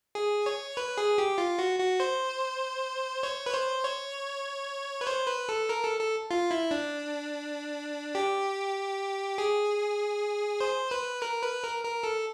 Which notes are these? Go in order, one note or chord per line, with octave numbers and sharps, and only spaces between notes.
G#4
C#5
B4
G#4
G4
F4
F#4
F#4
C5
C#5
B4
C5
C#5
B4
C5
B4
A4
A#4
A4
A4
F4
E4
D4
G4
G#4
C5
B4
A#4
B4
A#4
A#4
A4